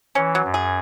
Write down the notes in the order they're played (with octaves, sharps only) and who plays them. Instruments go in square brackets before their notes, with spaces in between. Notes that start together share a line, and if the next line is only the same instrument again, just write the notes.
[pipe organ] E3 [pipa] C#4
[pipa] F#3
[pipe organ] F#2
[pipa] G#4